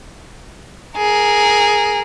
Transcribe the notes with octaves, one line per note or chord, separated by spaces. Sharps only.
G#4 A#4